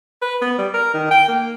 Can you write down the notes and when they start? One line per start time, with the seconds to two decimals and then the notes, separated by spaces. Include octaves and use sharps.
0.22 B4
0.42 B3
0.58 G3
0.74 A#4
0.94 D#3
1.11 G5
1.28 A#3